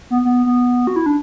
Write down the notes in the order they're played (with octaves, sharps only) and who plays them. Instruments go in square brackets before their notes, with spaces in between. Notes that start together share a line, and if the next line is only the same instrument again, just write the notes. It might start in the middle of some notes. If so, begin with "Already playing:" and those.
[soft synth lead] B3
B3
B3
F#4
E4
D4